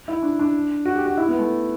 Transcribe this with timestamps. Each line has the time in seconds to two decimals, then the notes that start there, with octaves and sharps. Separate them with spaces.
0.08 E4
0.22 D4
0.39 D4
0.85 F#4
0.96 G4
1.05 F#4
1.17 E4
1.29 B3
1.39 A3